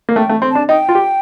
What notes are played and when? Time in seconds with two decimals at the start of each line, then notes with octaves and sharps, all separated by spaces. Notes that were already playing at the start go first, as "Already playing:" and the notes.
0.09 A#3
0.16 A3 G5
0.29 A3
0.42 C4
0.51 D4 A5
0.69 D#4 G5
0.89 F4
0.95 G4